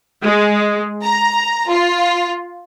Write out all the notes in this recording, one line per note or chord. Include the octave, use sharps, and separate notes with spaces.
G#3
A#5
F4